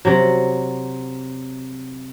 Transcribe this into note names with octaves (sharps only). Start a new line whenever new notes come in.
C3 F#3